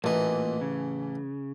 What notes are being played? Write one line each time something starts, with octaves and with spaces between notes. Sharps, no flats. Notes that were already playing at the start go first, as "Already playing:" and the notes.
A1 A#2 E3 A#3 D#5
C#3